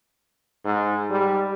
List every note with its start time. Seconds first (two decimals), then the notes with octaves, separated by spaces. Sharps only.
0.65 G#2
1.10 G3